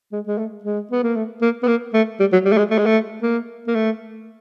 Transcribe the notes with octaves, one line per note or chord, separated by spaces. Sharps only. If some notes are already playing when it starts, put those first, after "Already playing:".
G#3
G#3
A3
G#3
B3
A#3
A3
A#3
B3
A#3
A3
G3
F#3
G3
A3
G#3
A3
G#3
A3
A#3
A#3
A3